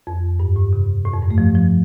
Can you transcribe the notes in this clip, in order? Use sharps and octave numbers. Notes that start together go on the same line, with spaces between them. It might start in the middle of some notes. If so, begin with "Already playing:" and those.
F2
G2
A2
C3
A2
F2
G2
A3
F3
F3